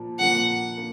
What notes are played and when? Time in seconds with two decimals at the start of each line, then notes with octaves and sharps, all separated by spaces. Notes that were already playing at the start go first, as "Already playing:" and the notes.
Already playing: A#2 F3 A#3
0.19 A#2 F3 A#3 F#5
0.77 A#3